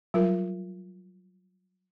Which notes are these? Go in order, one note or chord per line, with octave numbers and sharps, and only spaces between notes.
F#3 G3 F4 A#4